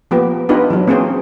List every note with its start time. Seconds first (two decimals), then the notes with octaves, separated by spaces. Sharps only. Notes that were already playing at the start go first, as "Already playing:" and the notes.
0.11 F3 A#3 B3 G4
0.49 B3 D4 D#4 F4 G4 B4
0.70 E3 F#3
0.88 A#3 C4 C#4 G#4 C5